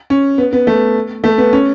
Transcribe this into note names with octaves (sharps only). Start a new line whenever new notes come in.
C#4
B3
B3
A3
A3
B3
C#4